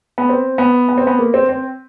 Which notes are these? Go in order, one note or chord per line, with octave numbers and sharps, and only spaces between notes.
B3
C4
B3
B3
C4
B3
A#3
C4
C4